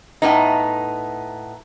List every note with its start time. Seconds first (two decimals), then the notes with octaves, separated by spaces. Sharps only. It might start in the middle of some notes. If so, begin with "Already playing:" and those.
0.22 A2 B3 D#4